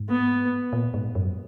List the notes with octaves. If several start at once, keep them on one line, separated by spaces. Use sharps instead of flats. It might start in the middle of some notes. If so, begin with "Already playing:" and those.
Already playing: G#2
B3
A#2
G#2
F#2